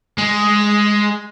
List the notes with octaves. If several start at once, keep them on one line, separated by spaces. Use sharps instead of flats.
G#3